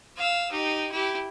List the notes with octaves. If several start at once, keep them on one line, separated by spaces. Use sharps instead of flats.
F5 E6
D#4 G4
E4 G4